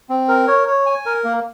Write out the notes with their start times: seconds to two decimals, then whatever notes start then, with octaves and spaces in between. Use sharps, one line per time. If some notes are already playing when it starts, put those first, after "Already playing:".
0.10 C4
0.28 A#4
0.48 C#5
0.67 C#5
0.86 G#5
1.06 A#4
1.24 A#3